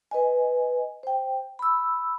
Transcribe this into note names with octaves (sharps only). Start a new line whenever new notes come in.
B4 D#5 G#5
C5 G5
B5 E6